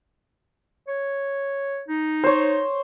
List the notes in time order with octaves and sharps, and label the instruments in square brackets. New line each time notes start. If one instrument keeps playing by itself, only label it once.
[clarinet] C#5
D#4
[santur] C5 C#5